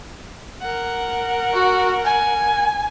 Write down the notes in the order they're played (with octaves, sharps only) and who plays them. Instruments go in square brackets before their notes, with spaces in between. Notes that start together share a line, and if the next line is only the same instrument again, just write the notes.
[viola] A#4 F#5
[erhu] F#4
G#5